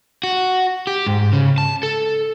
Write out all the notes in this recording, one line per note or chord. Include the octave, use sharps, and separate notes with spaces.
F#4
G4
G#2
C#3
A5
A4